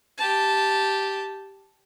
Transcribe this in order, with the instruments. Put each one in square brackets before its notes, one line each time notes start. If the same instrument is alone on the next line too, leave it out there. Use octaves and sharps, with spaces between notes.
[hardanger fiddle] G4 A5